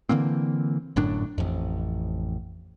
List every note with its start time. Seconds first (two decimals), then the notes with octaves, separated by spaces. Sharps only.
0.09 D3 E3 A#3 C4
0.96 G1 F#2 A2 D4
1.38 A1 F2